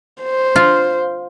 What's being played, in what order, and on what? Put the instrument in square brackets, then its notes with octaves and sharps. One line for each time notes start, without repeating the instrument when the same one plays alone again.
[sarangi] C5
[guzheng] F4